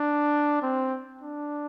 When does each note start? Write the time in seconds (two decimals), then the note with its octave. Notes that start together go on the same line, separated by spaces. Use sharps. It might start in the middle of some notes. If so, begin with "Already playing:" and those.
Already playing: D4
0.62 C4
1.22 D4